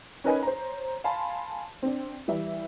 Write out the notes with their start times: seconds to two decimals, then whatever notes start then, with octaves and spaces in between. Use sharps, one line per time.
0.24 C#4 D#4 A#4 B4 D#5 G#5
0.43 C5 C#5 A#5
1.04 F5 G#5 A5 B5 C6
1.83 C4 D4
2.28 E3 G3 E5